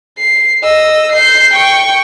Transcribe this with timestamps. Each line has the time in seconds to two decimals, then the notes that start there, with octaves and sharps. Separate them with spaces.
0.19 C7
0.64 D#5 E6
1.12 G6 C7
1.54 G5 C#6